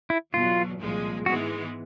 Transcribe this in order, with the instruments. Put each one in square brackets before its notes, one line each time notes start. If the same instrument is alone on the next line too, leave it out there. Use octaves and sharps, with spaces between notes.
[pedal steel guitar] E4
[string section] E2 B2 F#3 [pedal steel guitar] F4
[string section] C2 A#2 F3 G#3
[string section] G#2 E3 G#3 B3 [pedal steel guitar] F#4